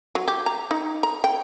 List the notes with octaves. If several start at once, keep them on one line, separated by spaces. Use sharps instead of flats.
F#3
G4
A#5
D#4
A#5
G5